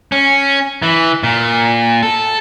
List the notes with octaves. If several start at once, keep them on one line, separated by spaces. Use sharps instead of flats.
C#4
E3
A#2
A4